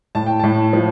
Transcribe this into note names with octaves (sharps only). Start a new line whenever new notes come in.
A2 A5
G5
A2 A5
F3